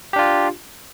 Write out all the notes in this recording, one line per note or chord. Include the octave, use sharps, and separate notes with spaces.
D4 F4 G4